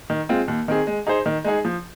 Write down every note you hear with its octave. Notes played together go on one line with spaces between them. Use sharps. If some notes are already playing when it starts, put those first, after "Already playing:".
D#3
G#3 C4 F4
D#2
D#3 C4 G#4
G#3
D#4 G#4 C5
D#3
G#3 D#4 G#4
F3